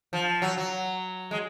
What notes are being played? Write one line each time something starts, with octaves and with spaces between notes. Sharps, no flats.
F3
F#3
F#3
G#3